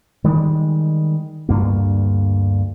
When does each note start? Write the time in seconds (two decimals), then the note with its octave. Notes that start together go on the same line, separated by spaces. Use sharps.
0.24 D#3 G3 G#3
1.49 D2 G2 A#3